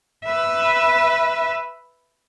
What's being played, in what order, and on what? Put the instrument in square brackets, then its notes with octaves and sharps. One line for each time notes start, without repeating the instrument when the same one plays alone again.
[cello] B4 E5